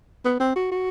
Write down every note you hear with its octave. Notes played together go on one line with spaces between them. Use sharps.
B3
C4
F#4
F#4